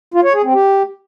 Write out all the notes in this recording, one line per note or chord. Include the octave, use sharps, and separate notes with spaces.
F4
C#5
G#4
C4
G4